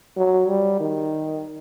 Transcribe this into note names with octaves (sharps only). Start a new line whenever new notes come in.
F#3
G3
D#3